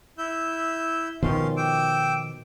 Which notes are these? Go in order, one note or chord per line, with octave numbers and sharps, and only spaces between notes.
E4 E6 G6
B2 D#3 F3 C#4 F5 C6
G5 D6 E6